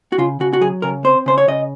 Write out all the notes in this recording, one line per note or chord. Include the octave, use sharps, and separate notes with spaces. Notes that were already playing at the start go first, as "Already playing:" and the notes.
F#4
C#3 F4
C#3 F#4
F#4
F#3 G#4
C#3 A#4
C4 C5
C#3 C5
C#5
C#3 D#5